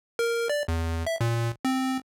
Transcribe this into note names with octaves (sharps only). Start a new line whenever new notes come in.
A#4
D5
E2
E5
A#2
C4